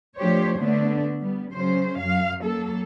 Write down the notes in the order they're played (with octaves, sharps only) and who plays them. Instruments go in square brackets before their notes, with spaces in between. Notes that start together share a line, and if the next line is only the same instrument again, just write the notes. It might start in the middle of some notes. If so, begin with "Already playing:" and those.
[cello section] F3 A3 D4 G4 C5 C#5
D3 A3 B3 D4
G3 B3
C#3 F#3 C#4 C5
F#2 F5
F#3 A#3 A4